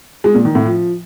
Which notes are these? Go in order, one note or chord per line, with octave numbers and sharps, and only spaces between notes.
G#3
A#2
D#3
A2
F3